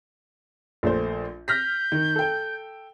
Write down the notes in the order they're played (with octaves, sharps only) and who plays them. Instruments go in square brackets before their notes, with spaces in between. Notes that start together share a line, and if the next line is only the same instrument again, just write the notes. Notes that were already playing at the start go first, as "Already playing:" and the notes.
[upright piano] A#1 A3 C5
[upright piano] F6 A#6 B6 [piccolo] G6
[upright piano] D#3
A4 G5